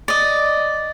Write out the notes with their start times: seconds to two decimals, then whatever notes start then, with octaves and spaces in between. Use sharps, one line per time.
0.08 D5 D#5